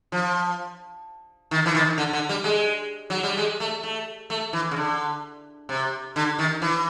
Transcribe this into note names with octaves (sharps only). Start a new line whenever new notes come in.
F3
D#3
E3
D#3
D3
D3
G3
G#3
F#3
G3
G#3
A3
A3
A3
E3
C#3
D3
C3
D3
D#3
E3